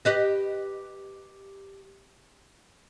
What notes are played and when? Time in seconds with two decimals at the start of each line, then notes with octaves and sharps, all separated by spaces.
0.05 G4 B4 D#5